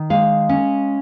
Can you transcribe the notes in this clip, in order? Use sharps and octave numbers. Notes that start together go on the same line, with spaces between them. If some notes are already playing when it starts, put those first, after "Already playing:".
Already playing: D#3
G#3 F5
C#4